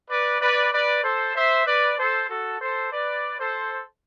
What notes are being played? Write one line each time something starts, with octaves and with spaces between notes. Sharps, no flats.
B4 D5
B4 D5
B4 D5
A4 C5
C5 E5
B4 D5
A4 C5
F#4 A4
A4 C5
B4 D5
A4 C5